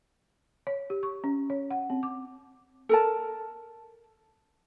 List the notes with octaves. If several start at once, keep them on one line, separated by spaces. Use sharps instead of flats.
C#5
G4
C#6
C#4
C#5
F#5
C4
D6
A4 A#4 A5